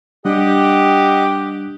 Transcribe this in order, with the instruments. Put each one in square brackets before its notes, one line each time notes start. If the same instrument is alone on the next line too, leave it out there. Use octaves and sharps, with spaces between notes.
[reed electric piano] G3 D4 [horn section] G4 [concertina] D#5 F#5